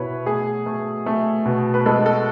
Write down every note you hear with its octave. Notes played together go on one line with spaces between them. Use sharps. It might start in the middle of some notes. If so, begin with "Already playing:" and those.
Already playing: B2 E4 B4 C#5
A3 G#4
A3
A3
B2
B4
G#3 A4
A4